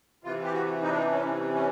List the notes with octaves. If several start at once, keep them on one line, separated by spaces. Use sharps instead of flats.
C3 E3 F4
G4
F#4
D#4
D4
D#4
C#4
C#4